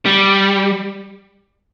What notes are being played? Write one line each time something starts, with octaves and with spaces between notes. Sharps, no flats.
G3